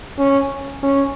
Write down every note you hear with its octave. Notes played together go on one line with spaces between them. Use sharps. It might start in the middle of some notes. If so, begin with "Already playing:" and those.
C#4
C#4